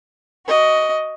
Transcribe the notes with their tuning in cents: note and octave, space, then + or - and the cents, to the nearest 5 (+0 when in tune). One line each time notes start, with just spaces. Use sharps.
F#4 +15 D#5 +5